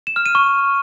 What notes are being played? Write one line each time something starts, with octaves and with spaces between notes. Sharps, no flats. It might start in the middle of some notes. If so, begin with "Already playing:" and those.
E7
F6
D#7
C#6